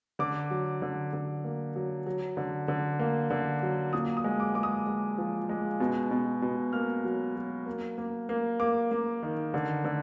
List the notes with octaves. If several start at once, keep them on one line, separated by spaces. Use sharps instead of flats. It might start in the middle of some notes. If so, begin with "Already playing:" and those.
D3 D6
F#3
D3
D3
A#3
F#3
F#3
D3
D3
A#3
D3
F#3
A#2 D#6
D#6
G#3
D6
G#3 D6
D#6
G#3
F3
G#3
B2
B2
B2
A#3 F6
F#3
F#3
A#3
A#3
A#3
A#3 D6
A#3
D#3
D3
D3